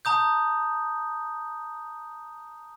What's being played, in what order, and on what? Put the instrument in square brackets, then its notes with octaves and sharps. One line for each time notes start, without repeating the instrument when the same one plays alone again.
[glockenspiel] A5 A#5 D#6 G6